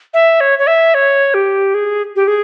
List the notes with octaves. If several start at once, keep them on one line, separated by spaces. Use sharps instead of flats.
E5
C#5
C#5
E5
C#5
G4
G#4
G4
G#4